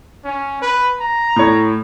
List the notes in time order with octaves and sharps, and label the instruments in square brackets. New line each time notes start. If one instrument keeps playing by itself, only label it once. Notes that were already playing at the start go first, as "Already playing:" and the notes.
[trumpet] C#4
B4
A#5
[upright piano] A2 C#5